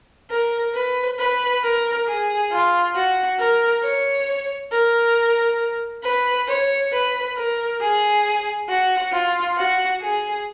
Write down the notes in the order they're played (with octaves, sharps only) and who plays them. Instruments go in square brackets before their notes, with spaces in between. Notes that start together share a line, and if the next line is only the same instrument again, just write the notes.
[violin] A#4
B4
B4
A#4
G#4
F4
F#4
A#4
C#5
A#4
B4
C#5
B4
A#4
G#4
F#4
F4
F#4
G#4